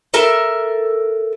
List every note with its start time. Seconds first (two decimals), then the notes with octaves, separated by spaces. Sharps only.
0.14 A4 A#4 E5